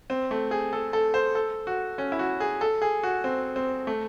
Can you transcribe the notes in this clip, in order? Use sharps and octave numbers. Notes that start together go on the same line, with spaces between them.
C4
A3
G#4
A4
A4
C5
A4
F#4
C#4
E4
F#4
G#4
A4
G#4
F#4
C4
C4
A3